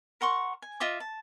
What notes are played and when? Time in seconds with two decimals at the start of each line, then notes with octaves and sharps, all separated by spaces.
0.21 A#4 F#5 C6 C#6
0.62 G#5
0.80 F4 D#5 E5 D6
1.00 A5